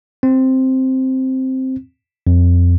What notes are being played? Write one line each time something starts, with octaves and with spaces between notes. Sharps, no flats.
C4
F2